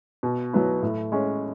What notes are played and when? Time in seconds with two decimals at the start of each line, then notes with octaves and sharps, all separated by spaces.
0.23 B2
0.53 F#3 B3 E4
0.82 A2
1.12 G#3 C#4